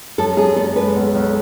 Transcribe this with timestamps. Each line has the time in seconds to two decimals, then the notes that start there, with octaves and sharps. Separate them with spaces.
0.18 F#2 A4
0.37 F#2 G#4
0.56 F#1 A4
0.76 G#3 B4
0.96 B1
1.15 B1